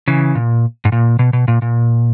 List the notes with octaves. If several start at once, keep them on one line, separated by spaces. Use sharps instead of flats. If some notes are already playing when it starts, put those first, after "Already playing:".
C#3 E3
A#2
G#2
A#2
B2
B2
A#2
A#2